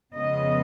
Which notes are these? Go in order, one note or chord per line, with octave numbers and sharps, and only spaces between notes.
F2 C#3 G#3 B3 D#5